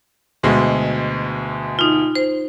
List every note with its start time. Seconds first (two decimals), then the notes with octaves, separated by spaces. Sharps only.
0.43 D2 B2 G#3
1.79 D#4 F4
2.15 C5